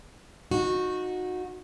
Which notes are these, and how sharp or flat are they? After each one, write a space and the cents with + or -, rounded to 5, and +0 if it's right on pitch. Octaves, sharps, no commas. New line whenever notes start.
D#4 +0 F#4 -20